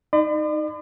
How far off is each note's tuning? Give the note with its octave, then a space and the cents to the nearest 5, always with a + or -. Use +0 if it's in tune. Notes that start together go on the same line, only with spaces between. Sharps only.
D#4 +0 D5 +45 B5 +45